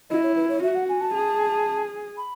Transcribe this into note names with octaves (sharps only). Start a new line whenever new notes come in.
E4 D#5
C#5
B4
C#5
F#4 E5
F#5
G#5
A5
G#4
B5